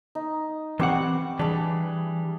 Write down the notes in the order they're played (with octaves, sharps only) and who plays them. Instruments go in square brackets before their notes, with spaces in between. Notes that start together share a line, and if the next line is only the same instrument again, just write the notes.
[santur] D#4
[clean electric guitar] E3 C4 F#5 [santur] G3 C#6 D6
[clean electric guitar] E3 G3 [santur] D4 G#4